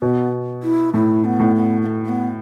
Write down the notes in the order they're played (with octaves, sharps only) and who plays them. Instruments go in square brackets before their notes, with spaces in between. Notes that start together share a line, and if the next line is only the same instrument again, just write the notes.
[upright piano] B2 [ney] B3
[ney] E4
[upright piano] A2 [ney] E4
[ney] B3
[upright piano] A2
[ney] B3
B3
A3
A3
B3